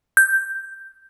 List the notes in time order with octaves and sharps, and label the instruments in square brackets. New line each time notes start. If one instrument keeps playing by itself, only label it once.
[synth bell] G6